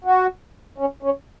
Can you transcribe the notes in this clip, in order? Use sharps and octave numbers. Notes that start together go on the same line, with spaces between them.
F#4
C#4
C#4